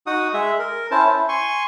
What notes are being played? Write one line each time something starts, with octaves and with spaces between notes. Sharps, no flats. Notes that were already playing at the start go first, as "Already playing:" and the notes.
D#4 F#4 F#5 D#6
G#3 G#4 E5
A#4
C#4 E4 C5 A5
E4
G#5 C6 C#6